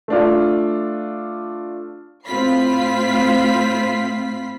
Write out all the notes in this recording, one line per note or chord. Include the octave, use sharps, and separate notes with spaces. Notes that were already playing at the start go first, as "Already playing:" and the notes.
A3 D4 F4
A2 C4 F4 B5 B6 C7